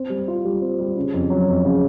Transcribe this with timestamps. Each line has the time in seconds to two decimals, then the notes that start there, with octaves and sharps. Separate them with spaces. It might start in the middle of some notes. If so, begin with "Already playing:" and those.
Already playing: C4
0.10 G3
0.28 F4
0.45 G3
0.62 C4
0.80 G3
0.97 C#3
1.13 F2
1.30 F#3
1.48 F2
1.65 C#3